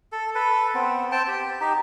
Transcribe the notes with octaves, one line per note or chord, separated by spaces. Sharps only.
A4
A4 B4
B3 C4
C4 G5 A5
G4
D#4 G4